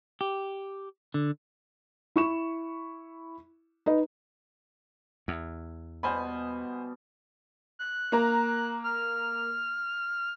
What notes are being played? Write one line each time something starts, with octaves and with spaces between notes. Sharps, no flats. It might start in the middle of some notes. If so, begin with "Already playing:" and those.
G4
D3
E4 C#6 E7
D#4 B4 D#5
E2
B2 G3 B3 C5 G#5 B5
F#6
A#3 A#4 A#5
F6